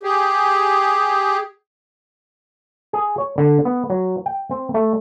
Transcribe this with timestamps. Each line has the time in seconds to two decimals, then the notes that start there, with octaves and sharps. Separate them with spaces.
0.03 G4 G#4
2.93 G#4
3.18 C#5
3.38 D3
3.65 B3
3.90 F#3
4.26 G5
4.51 C4
4.74 A3